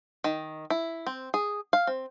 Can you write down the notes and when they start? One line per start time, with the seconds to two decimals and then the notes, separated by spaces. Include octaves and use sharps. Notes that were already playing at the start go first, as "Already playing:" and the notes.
0.24 D#3
0.70 E4
1.07 C4
1.34 G#4
1.73 F5
1.87 C4